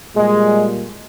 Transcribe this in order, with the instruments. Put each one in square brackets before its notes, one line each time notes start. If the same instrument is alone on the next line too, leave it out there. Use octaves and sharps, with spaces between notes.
[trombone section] A#2 G3 G#3